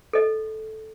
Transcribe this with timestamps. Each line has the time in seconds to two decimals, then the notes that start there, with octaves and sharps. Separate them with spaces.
0.13 A4 D#5